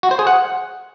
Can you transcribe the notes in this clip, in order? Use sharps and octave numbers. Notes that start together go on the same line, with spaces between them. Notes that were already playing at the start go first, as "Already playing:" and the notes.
F#4
C5
G#4
F#5